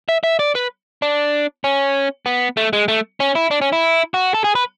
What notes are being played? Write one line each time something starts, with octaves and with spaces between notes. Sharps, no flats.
E5
E5
D5
B4
D4
C#4
B3
A3
G#3
A3
C#4
E4
D4
C#4
E4
F#4
A4
G#4
B4